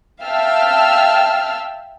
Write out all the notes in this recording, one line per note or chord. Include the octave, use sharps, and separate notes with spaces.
E5 F5 G5 A5 E6 F6